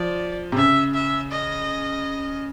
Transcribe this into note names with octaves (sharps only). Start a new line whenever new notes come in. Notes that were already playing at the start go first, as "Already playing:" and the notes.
Already playing: F3 D5
C3
C#3 E5
E5
D#5